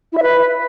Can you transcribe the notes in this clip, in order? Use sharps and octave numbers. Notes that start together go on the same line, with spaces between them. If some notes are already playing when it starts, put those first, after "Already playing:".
E4
E5
B4